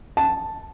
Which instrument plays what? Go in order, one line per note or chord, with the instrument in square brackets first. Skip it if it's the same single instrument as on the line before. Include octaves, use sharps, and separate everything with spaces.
[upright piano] A5